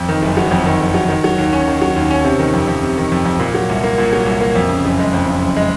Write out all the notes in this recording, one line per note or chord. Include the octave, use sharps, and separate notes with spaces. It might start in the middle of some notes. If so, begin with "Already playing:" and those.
Already playing: F2
D#3
F#1
F#3
F2
D#3
F#1
F#3
D#3
F#3
D#2
C#4
D#3
F#3
D#2
C#4
C3
D#3
F2
F2
C3
D#3
F2
F2
A#2
F#3
C2
A#3
A#2
F#3
C2
A#3
F2
C#3
F#1
G#3
F2
C#3
F#1
G#3